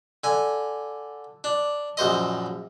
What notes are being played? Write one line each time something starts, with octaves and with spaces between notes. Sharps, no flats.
D3 G#5
D4
A#1 F#2 C5 D#5